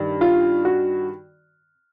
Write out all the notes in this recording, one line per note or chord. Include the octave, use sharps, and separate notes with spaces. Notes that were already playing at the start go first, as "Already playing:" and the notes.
Already playing: G2 D#3
F4
F#4